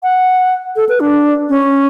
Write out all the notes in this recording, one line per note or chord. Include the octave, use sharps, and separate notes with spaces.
F#5
A4
B4
D4
C#4